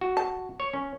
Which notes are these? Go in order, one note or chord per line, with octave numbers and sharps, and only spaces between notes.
F#4
A5
C#5
C#4